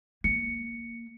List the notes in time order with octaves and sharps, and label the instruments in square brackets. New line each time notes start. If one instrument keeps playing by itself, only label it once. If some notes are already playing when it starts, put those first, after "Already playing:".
[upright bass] A#3 [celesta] C#7